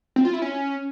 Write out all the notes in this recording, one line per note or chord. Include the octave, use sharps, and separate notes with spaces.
C4
F4
E4
C#4